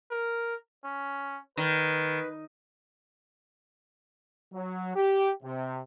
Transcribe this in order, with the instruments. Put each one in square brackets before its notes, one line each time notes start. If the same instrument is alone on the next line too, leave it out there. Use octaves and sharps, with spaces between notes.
[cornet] A#4
C#4
[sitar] D#3 [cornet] B4
[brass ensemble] F#3
G4
C3